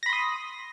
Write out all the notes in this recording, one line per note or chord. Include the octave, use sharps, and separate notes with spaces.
B5 C6 D#6 A#6